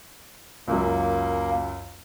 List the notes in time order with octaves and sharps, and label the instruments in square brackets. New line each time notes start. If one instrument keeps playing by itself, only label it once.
[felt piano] C#2 F#2 [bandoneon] A#3